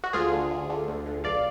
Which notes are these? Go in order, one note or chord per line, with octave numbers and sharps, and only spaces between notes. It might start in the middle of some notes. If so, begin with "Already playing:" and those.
F#4
D2 F4 G#4
D3
D2
D3
D2
D3
B1 D5 F5